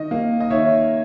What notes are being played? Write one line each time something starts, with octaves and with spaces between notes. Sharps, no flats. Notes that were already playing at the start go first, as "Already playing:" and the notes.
Already playing: D#3 D#5
A#3
D#5
D#3 C#5 E5